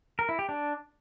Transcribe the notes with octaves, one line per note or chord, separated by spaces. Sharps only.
A#4
E4
G4
D4